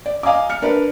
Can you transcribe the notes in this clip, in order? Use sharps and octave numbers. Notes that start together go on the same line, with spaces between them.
D5
D#5 F5 G#5 A#5 D6
F6 C#7
D4 A#4 B4